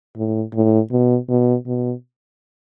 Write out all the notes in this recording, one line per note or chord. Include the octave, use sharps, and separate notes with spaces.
A2
A2
B2
B2
B2